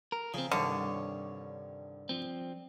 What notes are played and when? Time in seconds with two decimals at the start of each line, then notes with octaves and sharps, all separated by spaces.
0.12 A#4
0.34 C#3 F3 C4
0.52 C2 G2 D3 D#3 C#5
2.09 F3 C4